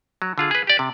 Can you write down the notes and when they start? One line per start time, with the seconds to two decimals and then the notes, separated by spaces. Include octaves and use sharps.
0.22 F#3
0.38 D3 F4 G#4
0.51 G#4 B4
0.67 G4 D5
0.79 C3